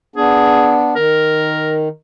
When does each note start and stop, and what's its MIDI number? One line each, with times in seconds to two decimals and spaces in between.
0.16 0.94 59
0.16 0.94 62
0.16 0.78 68
0.96 1.88 51
0.96 1.76 70